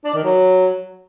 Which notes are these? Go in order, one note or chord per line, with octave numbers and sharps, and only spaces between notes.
D4
D#3
F#3